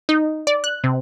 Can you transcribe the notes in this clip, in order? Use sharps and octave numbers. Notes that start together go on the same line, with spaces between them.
D#4
D5
F#6
C3